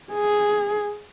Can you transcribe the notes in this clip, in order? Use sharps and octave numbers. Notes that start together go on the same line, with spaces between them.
G#4